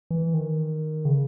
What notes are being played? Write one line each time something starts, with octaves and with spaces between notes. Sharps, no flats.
E3
D#3
C#3